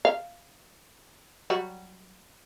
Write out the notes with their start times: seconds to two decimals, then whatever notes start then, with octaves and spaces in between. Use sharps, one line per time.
0.05 F5
1.50 F#3 G3 F#4